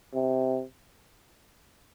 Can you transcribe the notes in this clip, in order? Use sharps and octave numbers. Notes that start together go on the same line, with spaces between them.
C3